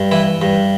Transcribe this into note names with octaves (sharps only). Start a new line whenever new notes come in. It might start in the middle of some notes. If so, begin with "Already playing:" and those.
Already playing: G2
E3 E4
G2